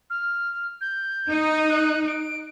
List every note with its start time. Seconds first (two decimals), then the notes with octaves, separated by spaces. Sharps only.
0.10 F6
0.81 G6
1.29 D#4
1.70 F#6
2.07 D7